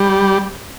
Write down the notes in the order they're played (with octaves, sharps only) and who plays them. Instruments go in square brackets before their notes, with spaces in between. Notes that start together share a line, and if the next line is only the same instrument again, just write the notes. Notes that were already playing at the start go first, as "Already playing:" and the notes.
Already playing: [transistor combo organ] G3